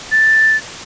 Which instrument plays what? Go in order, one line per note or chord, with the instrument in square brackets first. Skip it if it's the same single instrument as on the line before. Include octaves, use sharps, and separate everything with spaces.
[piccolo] A6